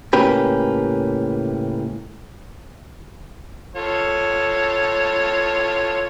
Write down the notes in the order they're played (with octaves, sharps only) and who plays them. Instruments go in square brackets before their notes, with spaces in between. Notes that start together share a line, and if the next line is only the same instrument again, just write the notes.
[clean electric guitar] C#2 A2 A#3 C#4 G4 B4
[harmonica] F4 A4 C#5